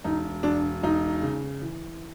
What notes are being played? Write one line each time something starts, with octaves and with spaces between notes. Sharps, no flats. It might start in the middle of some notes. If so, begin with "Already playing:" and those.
E1 D#4
E1 D4
E1 D#4
C#3
E3